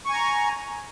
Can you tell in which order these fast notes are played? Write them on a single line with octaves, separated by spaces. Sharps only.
C#6 G#5 A#5